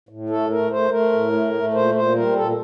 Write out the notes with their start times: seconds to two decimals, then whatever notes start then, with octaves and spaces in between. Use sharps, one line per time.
0.09 A2
0.29 A3 A4
0.50 A3 A#4
0.71 A3 C5
0.91 A3 A#4
1.12 A2
1.32 A3
1.53 A3
1.74 A#2 C5
1.94 A#2 C5
2.15 G3 A#4
2.36 A#2 A4